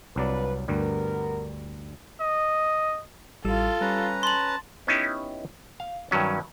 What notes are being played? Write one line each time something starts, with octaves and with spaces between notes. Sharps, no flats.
C2 F3 F#3 D4 B4 D5
D2 G2 G3 B3 A#4
D#5
A1 G3 F4 A4 E6
G3 C#4 B4 A#5
A5 C6 F#7
B3 C#4 D#4 E4 G4
F5
G2 D#3 F#3 C#4